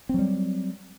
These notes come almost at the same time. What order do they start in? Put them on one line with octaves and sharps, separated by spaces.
C4 F#3 G3